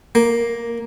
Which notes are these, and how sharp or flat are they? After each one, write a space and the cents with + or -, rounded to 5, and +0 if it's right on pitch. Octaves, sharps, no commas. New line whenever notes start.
A#3 +5